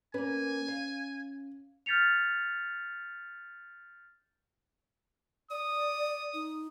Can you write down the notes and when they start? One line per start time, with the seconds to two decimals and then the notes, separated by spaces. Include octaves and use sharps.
0.14 A#3 C#4 B4 G#5
0.68 F5
1.86 F6 G6 A6 B6 C#7 F7
5.51 D5 D#6
6.34 D#4